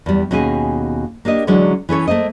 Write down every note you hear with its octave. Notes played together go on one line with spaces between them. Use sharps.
E2 G3
D#2 B2 C#4 D#4 G#4 G#5
A#3 D4 G4 D#5
D3 E3 F#3 G#3 C#4 D4
E3 C#4 A4 C#5
A3 A#3 C5 D#5